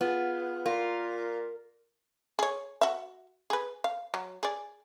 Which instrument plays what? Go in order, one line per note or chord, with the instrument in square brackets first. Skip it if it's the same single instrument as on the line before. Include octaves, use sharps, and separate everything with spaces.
[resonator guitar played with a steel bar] B3 [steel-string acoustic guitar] F4 G#4
[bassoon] A#2 [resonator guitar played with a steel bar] F4 [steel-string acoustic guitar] A#4
[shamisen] G#4 C#5
F#4 E5
G#4 B4
F5
F#3
G#4 D5